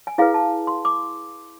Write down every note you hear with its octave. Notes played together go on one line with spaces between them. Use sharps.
G#5
E4 G#4 B4 F5
A5
C6
D6